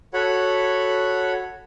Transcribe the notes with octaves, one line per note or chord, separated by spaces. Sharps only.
F#4 A4 C#5 F#5 B5